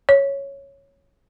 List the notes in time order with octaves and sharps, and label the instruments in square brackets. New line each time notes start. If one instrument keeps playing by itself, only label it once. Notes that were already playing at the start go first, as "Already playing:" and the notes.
[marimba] C#5